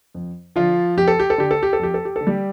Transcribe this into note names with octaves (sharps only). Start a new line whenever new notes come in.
F2
D3 F3 F4
F2 G4
A4
G4
A4
D3 G4
A4
G4
A4
F2 G4
A4
G4
D3 A4
G3 G4